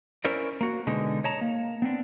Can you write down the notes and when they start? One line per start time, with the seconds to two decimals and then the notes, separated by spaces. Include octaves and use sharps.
0.25 C#4 E4 A#4 C5 D5
0.61 A#3 F#4
0.87 B2 D3 G#3 D#4
1.24 C#5 D#5 A5 A#5
1.41 A#3
1.82 B3 C4 D4